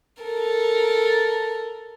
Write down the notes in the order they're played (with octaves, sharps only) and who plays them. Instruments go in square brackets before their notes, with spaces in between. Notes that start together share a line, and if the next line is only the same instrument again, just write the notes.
[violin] A4 A#4